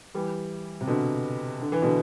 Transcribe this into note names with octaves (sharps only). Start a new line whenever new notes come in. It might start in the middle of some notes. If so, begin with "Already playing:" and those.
E3 G3
C3
B2 D3
D3
E3
B2 D3